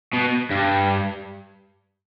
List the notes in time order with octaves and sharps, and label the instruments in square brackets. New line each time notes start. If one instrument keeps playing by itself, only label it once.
[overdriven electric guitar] B2
G2